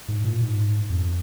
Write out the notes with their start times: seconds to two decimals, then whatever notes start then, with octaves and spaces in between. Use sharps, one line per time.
0.08 G#2
0.24 A#2
0.41 G#2
0.90 F2